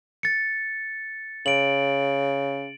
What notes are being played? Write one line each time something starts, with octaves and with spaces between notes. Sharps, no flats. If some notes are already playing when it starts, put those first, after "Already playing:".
A6 C#7
C#3 D7 F#7